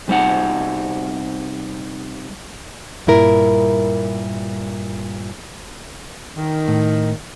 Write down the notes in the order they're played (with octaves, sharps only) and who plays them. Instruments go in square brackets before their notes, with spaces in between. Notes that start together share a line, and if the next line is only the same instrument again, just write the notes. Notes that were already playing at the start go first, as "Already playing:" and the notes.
[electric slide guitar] C3 G3 D#4 F#5
[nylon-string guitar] G2 A#2 E4 A#4
[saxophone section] D#3
[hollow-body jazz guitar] A2